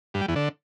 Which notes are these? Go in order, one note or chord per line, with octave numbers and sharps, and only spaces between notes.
G2
G3
E2
D3